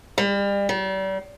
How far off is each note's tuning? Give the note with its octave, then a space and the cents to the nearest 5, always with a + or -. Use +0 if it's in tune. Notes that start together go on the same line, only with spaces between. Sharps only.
G3 +35
G3 -35